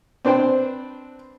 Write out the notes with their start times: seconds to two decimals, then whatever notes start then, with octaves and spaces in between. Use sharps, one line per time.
0.25 C4 D4 B4 C5 G5